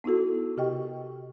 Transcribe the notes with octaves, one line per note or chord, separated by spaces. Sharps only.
B3 D#4 E4 F#4 A4
C3 G4 D#5 G5 C#6